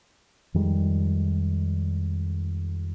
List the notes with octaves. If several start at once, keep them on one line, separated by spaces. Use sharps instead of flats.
F2 D#3 G3 G#3